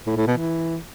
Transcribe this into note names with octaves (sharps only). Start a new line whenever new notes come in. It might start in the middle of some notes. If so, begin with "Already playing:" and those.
A2
A2
B2
E3